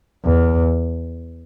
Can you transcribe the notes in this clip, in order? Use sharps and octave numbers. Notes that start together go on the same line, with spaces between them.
E2